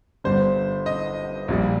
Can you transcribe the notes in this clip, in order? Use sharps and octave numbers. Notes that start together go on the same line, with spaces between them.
G1 G2 D3 C5
D#5
A#1 A#2 G3